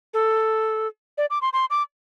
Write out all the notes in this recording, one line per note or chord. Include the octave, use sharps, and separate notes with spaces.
A4
D5
D6
C6
C6
D6